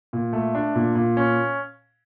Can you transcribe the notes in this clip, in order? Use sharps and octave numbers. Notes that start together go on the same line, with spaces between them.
A#2
A3
D4
A#2
A#2
C#4